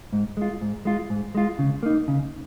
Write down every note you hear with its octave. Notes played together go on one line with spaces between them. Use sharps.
G#2
G#3 F4
G#2
G#3 F4
G#2
G#3 F4
C#3
A#3 D#4
C#3